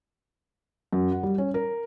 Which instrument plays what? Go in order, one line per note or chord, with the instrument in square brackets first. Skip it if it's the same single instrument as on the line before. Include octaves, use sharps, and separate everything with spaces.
[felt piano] F#2
F#5
G3
C#4
A#4